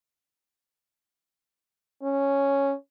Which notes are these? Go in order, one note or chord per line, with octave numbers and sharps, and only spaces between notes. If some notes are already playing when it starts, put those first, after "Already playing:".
C#4